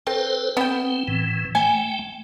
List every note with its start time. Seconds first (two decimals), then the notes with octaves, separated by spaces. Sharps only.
0.07 C4 A4 B4 C5
0.57 B3 C4 G5
1.08 A2 E3
1.55 A3 G5 G#5